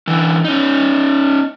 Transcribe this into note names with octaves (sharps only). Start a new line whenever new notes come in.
D3 E3
C#4 D#4